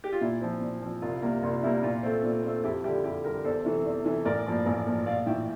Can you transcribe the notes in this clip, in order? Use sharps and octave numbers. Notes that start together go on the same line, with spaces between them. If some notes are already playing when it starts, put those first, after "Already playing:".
G4
F4
A#2 E4
F3 C4
A#2
F3 C4
C2 F4
C3 G3 A#3
C2 F4
C3 G3 A#3 E4
A#2 F4
A3 C4
A#2
A3 C4
F2 E4 G4
D3 G3 E4 G4
F2 E4 G4
D3 G3 G4 A#4
E2 A4 C5
C3 E3 A3
E2
C3 E3 A3
A1 A#4 D5
G2 F3 A#3
A1
G2 F3 A#3
A#1 D5 F5
A2 E3 E5 G5